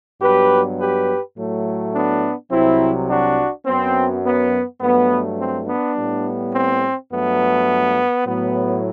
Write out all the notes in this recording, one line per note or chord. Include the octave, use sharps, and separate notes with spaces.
G2 F#3 B3 G4 B4
G4 B4
A2 F#3 A3
B3 D4
C2 C3 F#3 C4 E4
D4 F#4
F#2 F#3 B3 C4
B3
G2 F#3 A3 B3
C4
B3 D4
A2 G3 B3
C4
G2 F#3 A3 B3
A2 F#3 B3